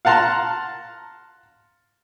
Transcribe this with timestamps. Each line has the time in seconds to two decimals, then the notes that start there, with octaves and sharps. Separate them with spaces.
0.05 F5 F#5 A5 A#5 C6